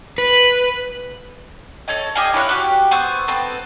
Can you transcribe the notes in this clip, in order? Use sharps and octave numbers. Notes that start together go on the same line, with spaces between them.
B4
A4 C#5 D#5
G4 D#5 F5 G#5
E4 C#5 F5 F#6
F#4 G4
B3 C5 C#6 E6
B3 C4 A4